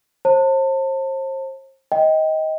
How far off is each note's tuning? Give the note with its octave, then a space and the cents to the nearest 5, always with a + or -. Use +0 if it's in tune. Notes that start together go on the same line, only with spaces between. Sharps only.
C5 +40 A5 +40
D#5 +20 G5 +0